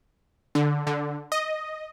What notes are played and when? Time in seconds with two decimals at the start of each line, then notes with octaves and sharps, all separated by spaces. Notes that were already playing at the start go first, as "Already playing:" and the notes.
0.55 D3
0.87 D3
1.32 D#5